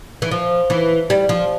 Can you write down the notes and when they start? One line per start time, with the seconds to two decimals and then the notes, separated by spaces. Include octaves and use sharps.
0.22 E3
0.31 F3
0.70 E3
1.10 G3
1.29 F3